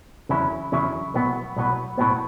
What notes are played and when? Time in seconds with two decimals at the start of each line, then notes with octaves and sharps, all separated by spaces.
0.29 E2 C#3 F#3 C#4 E4
0.72 E2 C#3 F#3 C#4 E4
1.14 B1 A2 F#3 B3
1.56 B1 A2 F#3 B3
1.98 B1 A2 F#3 B3